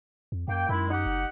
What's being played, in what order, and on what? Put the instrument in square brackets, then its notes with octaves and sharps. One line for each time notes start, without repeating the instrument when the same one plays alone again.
[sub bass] F2
[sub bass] F#2 [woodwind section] A#3 G5
[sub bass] F#2 [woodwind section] D#3 G#3 E4
[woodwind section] D#4 G4 F#5
[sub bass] F#1